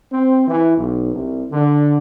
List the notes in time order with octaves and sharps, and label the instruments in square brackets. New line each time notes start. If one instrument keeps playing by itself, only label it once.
[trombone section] C4
E3
B1
C2
D3